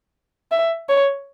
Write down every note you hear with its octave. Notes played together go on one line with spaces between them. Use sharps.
E5
C#5